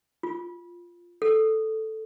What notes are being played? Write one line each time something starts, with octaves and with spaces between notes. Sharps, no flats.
F4
A4